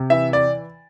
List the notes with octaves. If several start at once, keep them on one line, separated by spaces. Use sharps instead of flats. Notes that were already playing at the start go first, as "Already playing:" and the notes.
Already playing: C3
E3 E5
D5